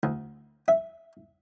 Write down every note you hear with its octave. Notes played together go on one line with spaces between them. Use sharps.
D2
E5